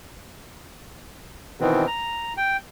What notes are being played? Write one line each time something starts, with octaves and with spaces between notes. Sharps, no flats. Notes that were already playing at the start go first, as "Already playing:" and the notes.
B2 D#3 E3 B3 C4
A#5
G5